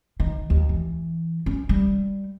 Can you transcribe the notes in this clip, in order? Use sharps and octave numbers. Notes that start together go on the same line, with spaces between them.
D#3
D#2
E3
C#4
G3